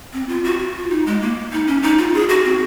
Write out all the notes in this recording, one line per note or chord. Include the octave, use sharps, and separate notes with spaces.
C4
F4
F#4
F#4
F4
D#4
G#3
A#3
D#4
C#4
D#4
F4
G#4
F#4
C4